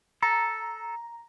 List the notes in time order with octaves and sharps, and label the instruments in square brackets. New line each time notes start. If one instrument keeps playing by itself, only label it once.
[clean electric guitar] A4 [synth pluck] A#5